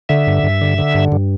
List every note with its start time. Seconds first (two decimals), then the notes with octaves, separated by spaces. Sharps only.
0.09 D3 E5
0.27 G2
0.43 G2
0.61 D3
0.78 D3
0.95 G2
1.12 G2